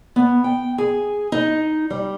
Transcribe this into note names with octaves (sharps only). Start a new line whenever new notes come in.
B3
G5
G#4
D#4
G3